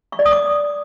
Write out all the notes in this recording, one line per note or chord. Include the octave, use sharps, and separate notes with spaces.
C#6
D5
D#6
D6